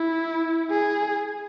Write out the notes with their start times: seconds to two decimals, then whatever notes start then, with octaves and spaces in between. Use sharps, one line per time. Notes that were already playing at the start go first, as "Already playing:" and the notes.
Already playing: E4
0.70 G#4